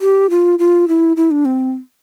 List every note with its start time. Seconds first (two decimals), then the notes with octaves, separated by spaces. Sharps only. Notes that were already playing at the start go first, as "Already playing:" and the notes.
0.01 G4
0.30 F4
0.59 F4
0.88 E4
1.17 E4
1.31 D4
1.45 C4